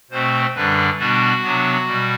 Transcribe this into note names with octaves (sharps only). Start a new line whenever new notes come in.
B2 A3 C4 C5
F#2 D3 G3 D4 B4
B2 G3 B3 D4 F#4
C3 F#3 B3 D4
B2 G3